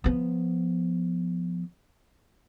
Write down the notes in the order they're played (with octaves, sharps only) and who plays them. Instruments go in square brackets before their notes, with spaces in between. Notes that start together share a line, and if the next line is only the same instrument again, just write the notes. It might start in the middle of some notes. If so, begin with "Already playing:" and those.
[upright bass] F3 B3